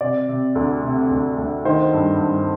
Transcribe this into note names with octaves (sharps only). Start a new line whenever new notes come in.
C3 D5
C3
D2
C3
D2
D2
D#3 C5
G2
G2